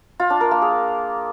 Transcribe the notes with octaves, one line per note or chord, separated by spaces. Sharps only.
F4
D4
A#4
A#3
G#4